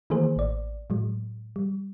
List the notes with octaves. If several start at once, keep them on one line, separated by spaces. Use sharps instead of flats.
D#3 E3 A3 A#3 G#4 C5
A1 D5
A2 F#3 G#3
G3